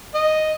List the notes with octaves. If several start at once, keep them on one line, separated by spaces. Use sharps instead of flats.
D#5